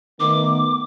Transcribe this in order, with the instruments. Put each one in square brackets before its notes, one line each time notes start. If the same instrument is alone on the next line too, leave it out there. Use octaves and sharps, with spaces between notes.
[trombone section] D#3 A3 B3 [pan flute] D6